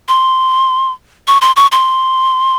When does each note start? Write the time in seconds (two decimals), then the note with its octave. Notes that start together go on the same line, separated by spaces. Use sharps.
0.08 C6
1.28 C#6
1.42 C6
1.56 C#6
1.72 C6